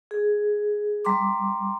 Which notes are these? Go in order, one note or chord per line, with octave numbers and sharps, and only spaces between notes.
G#4
G3 A#5 C6 D6